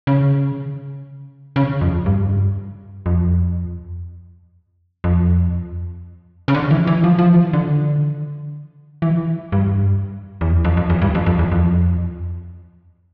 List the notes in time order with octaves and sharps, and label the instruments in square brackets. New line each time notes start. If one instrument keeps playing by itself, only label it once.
[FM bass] C#3
C#3
F2
G2
F2
F2
C#3
D3
E3
E3
F3
F3
E3
D3
E3
G2
E2
F2
F2
F2
E2
G2
F2
F2
E2
F2